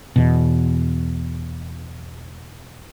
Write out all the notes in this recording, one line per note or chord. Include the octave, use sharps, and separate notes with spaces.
E2 B2